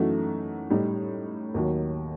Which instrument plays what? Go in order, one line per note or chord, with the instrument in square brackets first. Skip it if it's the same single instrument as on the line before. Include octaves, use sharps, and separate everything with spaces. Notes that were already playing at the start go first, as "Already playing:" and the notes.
Already playing: [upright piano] F#2 E3 A3 D#4 F#4
A2 G3 D#4
D#2 D#3 F#3